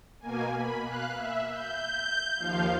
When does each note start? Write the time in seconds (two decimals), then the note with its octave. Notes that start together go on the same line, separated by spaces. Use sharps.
0.20 B2 A#3 G#5
0.55 B5
0.85 F5 F#6
1.15 E5
1.50 G6
2.39 D#2 F3 F5